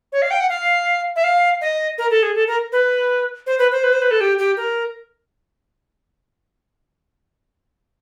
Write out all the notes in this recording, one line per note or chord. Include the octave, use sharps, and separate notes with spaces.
C#5
F5
G5
F#5
F5
E5
F5
D#5
A#4
A4
G#4
A4
A#4
B4
C5
B4
C5
B4
C5
B4
A4
G4
G4
A#4